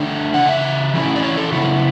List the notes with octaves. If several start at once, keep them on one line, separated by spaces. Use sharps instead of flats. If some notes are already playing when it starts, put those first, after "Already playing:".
Already playing: D3 A3 D4 G5
C#3 E3 F#5
E5
E3 A3 C#4 E4
D5
C#5
A4
C#3 F#3 B3 E4 F#4